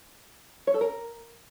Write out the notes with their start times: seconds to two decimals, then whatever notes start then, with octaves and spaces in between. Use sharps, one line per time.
0.67 C#5
0.74 A4
0.81 A#4